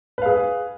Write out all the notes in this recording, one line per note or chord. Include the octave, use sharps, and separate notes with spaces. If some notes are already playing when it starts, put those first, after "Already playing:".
G#4 B4 F5